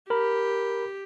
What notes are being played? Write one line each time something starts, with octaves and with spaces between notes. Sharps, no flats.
G4 A#4 B5